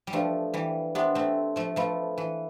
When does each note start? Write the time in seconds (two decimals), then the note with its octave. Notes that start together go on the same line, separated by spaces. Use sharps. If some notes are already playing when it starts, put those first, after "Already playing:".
0.07 G3
0.13 F3 A3 D4 G4 B4 D5 F5
0.54 E3 G3
0.95 B3 D4 G4 C5 E5 G5 C6
1.15 A3 C4
1.56 F3 A3
1.76 F3 A3 B4 F5 B5
2.18 E3